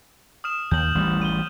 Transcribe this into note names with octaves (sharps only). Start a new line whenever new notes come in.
D#6 F6 E7
D#2 G6 F#7
A1 E3 G3
D#7 G7